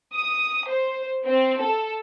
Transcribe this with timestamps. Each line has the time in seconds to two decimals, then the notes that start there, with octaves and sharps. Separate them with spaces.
0.15 D#6
0.70 C5
1.27 C4
1.61 A4